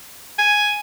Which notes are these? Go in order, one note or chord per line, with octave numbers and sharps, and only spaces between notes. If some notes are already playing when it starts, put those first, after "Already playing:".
G#5